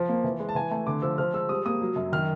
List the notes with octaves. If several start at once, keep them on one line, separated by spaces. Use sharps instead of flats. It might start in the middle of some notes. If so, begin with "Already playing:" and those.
Already playing: F3
A#3
E3
G#3
A5
E3 G#5
A3 G#5
D3 D6
F3 E6
F3 F6
G#3 E6
G3 D#6
A#3 D#6
F#3
F#2
D#3 F6